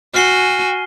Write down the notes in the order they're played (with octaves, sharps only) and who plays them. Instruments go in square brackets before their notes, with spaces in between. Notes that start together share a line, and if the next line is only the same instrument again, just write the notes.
[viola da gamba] F#4 [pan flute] G#5 [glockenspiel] F6 C7 G7